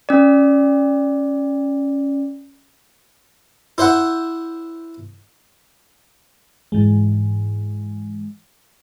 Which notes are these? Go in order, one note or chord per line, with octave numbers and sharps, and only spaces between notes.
C#4 D5
E4 C5 E5 F#5
G#2 E3 G#3